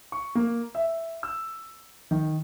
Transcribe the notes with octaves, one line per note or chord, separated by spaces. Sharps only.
C#6
A#3
E5
E6
D#3